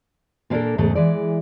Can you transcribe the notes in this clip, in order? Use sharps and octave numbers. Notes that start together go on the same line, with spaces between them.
A#2 A#3 B3 D4 A4 A#4
E2 G#2 C#3 A3
E3 G#3 D5